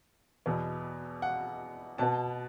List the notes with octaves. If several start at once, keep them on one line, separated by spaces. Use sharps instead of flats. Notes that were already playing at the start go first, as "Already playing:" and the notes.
E2 B2 B3
F#5
B2 B3 A5